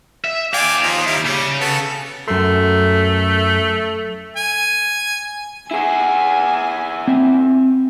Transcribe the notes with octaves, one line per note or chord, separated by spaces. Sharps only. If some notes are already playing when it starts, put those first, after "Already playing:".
E5
D#2 D5 F5 G5 G#5
F3 D#4
G3 E4
C#3 G3
B3 F#4 A4
F#2 A3 C6
G#5
E4 G#4 G#5
C4 E5